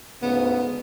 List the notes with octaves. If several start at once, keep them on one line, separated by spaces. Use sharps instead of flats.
D2 G#2 C#3 B3